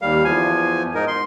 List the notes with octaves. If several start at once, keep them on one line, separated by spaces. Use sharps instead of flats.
D#2 G3 F5
E2 F3 G#5
G#2 D#4 A#4
C6